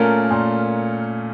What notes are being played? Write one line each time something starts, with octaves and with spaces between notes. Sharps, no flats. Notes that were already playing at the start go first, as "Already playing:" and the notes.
Already playing: A#2 A3 C#4 F4 A#4
A#2